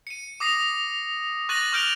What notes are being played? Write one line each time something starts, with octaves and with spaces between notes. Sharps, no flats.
C#7 D#7
D6 D#6 A#6 C7
C#6 F#6 A6 A#6 D#7 F#7
C#6 F6 G6 D7 F7 G7